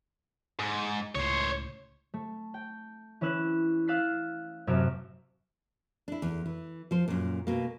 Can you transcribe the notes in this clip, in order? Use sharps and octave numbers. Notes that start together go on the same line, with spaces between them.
G#2
C#2 A2 C5 C#5
A3
G5
E3 C#4 B4 E6 F#6
F5 E6 F#6 A6 B6 C7
A1 F#2 C3 A#4 E6 F6
D4 E4
E2
E3
F3 C5
F#2 A#2
B2 A#3